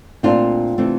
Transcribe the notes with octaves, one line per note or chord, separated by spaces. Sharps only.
A#2 A3 C4 D4 F4
C3 E3 A3 C4